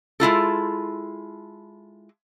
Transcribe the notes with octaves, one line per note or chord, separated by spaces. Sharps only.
G#3 E4 F4 A4